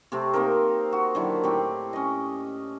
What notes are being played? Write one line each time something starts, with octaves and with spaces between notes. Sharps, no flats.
C3 A3 C4
A#3 C4 D#4 A#4
F#4
D3 D#3 F#3 E4
A2 C4 G4
C#4 D#5